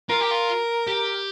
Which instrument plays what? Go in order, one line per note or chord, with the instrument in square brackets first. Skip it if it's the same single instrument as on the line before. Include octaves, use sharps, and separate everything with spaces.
[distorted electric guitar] F4 [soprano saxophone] A#4
[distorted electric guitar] G4
F4
G4